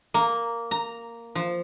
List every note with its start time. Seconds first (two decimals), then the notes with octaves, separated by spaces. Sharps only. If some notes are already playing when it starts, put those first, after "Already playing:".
0.14 A#3
0.71 A#5
1.35 F3